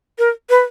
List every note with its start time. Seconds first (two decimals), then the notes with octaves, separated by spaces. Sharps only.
0.19 A#4
0.50 B4